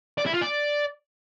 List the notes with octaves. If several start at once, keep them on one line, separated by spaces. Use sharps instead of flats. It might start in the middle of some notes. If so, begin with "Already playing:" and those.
D5
E4
F4
D5